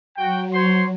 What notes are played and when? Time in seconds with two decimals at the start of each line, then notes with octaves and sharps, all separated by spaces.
0.17 F#3 F#4 G5
0.53 C5 C#5 C6